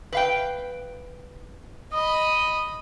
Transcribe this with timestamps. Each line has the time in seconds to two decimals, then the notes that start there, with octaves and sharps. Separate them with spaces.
0.13 B4 F5 G5
1.93 D#5 B5 D#6